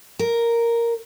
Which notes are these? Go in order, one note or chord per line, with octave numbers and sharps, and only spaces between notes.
A#4